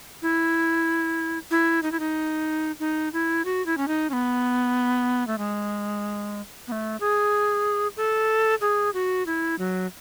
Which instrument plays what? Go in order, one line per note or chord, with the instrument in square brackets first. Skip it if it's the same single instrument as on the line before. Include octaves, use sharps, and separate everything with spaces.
[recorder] E4
E4
D#4
E4
D#4
D#4
E4
F#4
E4
C#4
D#4
C#4
B3
A3
G#3
B3
A3
G#4
A4
G#4
F#4
E4
F#3